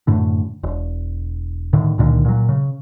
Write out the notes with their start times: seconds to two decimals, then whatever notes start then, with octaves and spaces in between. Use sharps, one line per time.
0.07 F#2 A2 D3
0.63 E1
1.73 A2 D3 D#3
1.98 C#2 A#2 D3 D#3
2.25 A#2 F#3
2.49 C#3